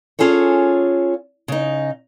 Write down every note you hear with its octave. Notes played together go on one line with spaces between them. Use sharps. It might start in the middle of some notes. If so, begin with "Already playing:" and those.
C#4 F4 G#4 A4 C#5
C#3 D#4